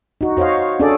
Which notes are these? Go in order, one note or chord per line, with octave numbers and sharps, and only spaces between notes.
D#4 F#4
F#4 C5 C#5 D#5 F5
C#4 D4 G#4 A4 D5